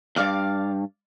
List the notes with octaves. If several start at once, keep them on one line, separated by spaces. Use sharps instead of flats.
E2 G2 D5 F5 D6